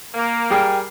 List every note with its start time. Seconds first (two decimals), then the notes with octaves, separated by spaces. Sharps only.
0.15 A#3
0.50 G3 G#4 A#4 G5